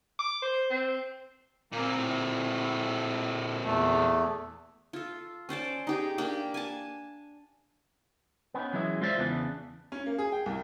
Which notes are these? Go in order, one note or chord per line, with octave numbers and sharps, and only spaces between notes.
D6
C5
C4
A#2 A#3 C4
A2
E2 A3
F4 A4
C#4 C5 D5 A5
D#4 G4 G#4
A#3 D4 G4
G#5 A5
B3 C#4 D#4
E3 F#3 G#3 C#4 E4
G#3 F4 C5 D5 E5
E2 C#3 E3 B3 D4
C#4
A#3
G#4
G5
C2